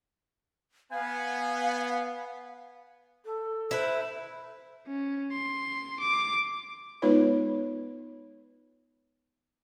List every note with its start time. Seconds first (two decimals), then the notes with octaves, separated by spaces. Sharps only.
0.92 B3 F5 G#5
3.25 A4
3.71 E4 B4 C5
4.87 C#4
5.33 C6
6.00 D6
7.02 G#3 B3 D#4 F4 B4 C#5